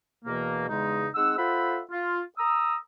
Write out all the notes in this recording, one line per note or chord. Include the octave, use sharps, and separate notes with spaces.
E2 B2 E3 A#3
E2 C#3 G#3 D#4
G#3 C4 D#4 F#5 E6
F4 A4 C5 E5 F#5 B5
F4
A#5 D#6 E6